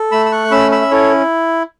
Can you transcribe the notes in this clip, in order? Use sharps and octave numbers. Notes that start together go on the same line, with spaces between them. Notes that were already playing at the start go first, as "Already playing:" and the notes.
Already playing: A4
A3 B5 E6
E6
C#6 F#6
C#4 B5 E6
B5 E6
E5
E4 A4 C#5